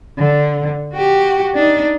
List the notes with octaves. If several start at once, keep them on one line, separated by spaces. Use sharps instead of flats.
D3
F#4 G4
D4 D#4